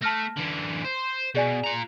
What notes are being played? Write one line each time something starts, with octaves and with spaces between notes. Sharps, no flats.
A3 A5 F6 A#6
D3 E3
C5
B2 G#4 D5 G#5
F4 A#5